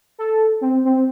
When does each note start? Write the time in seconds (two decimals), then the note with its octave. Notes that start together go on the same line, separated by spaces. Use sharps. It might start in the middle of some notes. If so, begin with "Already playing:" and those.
0.19 A4
0.61 C4
0.85 C4